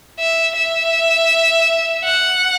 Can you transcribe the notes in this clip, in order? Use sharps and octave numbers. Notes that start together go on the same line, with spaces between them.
E5
E5
F#5